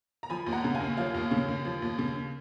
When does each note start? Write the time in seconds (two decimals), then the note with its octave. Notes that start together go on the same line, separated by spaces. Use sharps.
0.23 A#5
0.30 F3 G#5 B5
0.46 D#2
0.52 F#5 A#5
0.64 C#3
0.75 F5 G#5
0.80 D#2
0.97 F3 C#5 F5
1.14 D#2
1.31 C#3
1.48 D#2
1.65 F3
1.82 D#2
1.98 C#3